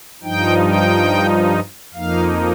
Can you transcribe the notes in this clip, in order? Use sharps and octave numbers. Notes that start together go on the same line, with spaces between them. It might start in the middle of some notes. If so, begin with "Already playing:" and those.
G2 F3 D#4 G5
G5
F2 F3 A#3 D#4 F5